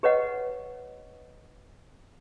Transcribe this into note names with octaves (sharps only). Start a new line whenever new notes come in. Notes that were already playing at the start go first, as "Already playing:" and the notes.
G4 B4 C#5 D#5 F#5